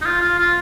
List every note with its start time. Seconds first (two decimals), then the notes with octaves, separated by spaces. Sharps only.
0.02 D#4
0.05 F4
0.21 F4
0.38 F4